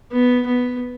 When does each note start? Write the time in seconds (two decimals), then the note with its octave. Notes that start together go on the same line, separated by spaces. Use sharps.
0.12 B3
0.46 B3